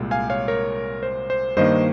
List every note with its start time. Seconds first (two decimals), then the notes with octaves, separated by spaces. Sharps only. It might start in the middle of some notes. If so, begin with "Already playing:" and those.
Already playing: C2 A#2 G#3
0.11 F5 G#5
0.30 C#5 F5
0.48 A#4 C#5
1.03 C5
1.30 C5
1.57 G2 D#3 A#3 C5 D#5